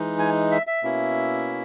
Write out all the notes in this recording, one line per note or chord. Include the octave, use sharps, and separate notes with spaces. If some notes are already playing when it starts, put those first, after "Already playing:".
Already playing: E3 G#3 D#4
G#5
E5
E5
B2 A#3 C#4 E4